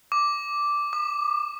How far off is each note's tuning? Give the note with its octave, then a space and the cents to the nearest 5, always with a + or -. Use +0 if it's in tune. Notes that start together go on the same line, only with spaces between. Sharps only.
D6 -5
D6 +40